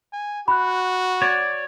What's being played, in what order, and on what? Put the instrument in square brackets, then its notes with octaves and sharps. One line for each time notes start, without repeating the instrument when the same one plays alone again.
[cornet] G#5
[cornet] F#4 [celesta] B5 F#6
[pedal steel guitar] C#5 D5